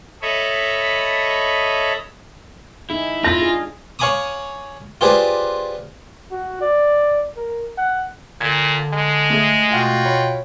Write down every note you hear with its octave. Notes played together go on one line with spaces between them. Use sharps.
A4 C#5 D#5 E5 B5
D#4 E4 G#4
F4 A#6
D4 G#4
C#5 F5 G#5 B5 D6 D#6
F4 G4 G#4 B4 C5 D5
F#4
D5
A#4
F#5
A#2 D3 G#6
G#3
A3 G#4
B2 F4 F#4 G5
C#5 B5